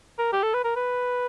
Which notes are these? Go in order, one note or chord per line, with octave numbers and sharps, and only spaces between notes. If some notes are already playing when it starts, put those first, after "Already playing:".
A#4
G4
A4
B4
A#4
B4